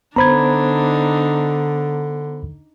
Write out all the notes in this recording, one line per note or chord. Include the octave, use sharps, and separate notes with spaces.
D3 B3 D4 D#4 C5 A#5 B5 G#6